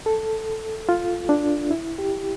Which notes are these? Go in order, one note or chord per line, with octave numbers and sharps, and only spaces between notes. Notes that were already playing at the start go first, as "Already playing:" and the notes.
A4
F4
D4
E4
G4